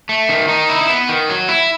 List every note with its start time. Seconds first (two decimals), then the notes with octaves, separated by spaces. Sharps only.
0.09 A3
0.29 D#3
0.48 D#4
0.69 E4
0.89 B3
1.09 D#3
1.29 F#3
1.49 E4